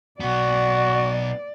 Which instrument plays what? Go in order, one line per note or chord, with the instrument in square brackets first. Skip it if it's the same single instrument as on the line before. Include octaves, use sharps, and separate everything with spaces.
[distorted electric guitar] B1 B3 [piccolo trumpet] F#4 [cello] D5